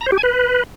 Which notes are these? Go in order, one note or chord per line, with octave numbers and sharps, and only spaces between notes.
A#5
C5
G4
G#5
B4